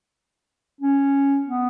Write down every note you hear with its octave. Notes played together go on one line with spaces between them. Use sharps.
C#4
B3